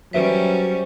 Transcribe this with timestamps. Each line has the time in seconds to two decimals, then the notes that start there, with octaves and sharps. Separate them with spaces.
0.13 F#3 G3 C#4 B4 C5 E5 B6